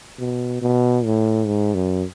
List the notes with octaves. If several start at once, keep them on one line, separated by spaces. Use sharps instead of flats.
B2
B2
A2
G#2
F#2